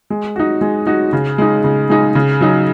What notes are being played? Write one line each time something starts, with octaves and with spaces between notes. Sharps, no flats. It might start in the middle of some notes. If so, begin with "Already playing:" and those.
G#3
D#4 F#4
G#3
D#4 F#4
C#3
G#3 D#4
C#3
G#3 D#4
C#3
F#3 D#4